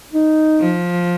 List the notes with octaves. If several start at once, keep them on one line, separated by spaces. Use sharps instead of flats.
D#4
F3